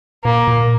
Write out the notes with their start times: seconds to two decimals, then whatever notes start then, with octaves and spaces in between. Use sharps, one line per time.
0.24 A#2 A#3
0.47 A#2